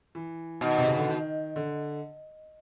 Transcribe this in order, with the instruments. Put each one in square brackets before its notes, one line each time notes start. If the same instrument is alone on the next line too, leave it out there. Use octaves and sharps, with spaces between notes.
[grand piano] E3
[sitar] B2 [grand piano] D#3
[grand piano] C3
C#3
D3
D#3
D3